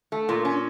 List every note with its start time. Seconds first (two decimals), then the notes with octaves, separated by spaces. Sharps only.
0.12 A3
0.29 A#2
0.45 C#4